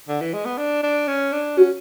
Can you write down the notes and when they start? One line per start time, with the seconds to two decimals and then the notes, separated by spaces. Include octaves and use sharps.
0.08 D3
0.21 E3
0.33 G#3
0.45 B3
0.58 D4
0.83 D4
1.07 C#4
1.32 D4
1.57 C#4 F#4